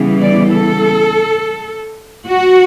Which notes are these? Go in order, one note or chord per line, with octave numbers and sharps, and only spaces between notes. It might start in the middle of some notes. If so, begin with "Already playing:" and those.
Already playing: C#3 E3 G3 B3
D5
A4
F#4